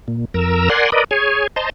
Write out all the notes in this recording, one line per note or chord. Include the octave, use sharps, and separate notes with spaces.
A#2
F2 A#4 A#5 E6
A#4 D5 F#5 G#5 C6
A#4 B4 D5 D#5
G#4 C#5 G#5
C5 D#5 A5 A#5 C6